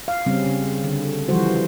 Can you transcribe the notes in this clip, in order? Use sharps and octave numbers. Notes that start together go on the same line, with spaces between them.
F5
C#3 G3 C4 C#4
C#3
D3
E3 F3 G3 F#4 C5